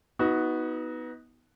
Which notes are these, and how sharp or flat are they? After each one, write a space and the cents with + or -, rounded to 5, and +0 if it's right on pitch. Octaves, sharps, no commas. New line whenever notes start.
B3 +0 D#4 +35 F#4 +0